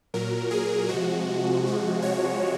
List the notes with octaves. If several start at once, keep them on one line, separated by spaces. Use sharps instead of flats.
A#2 F#3 A#4
G#4
C3 F3 G#3 F#4
C3 F3 G#3
C#5